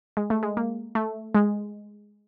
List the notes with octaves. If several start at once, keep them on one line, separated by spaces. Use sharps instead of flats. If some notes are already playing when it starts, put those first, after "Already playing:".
G#3
A3
G#3
A#3
A3
G#3